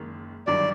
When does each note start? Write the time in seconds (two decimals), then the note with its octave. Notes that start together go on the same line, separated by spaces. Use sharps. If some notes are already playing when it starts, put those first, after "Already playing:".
Already playing: F#1 F#2 D#3 G#3
0.47 G1 G2 D#3 F#3 D5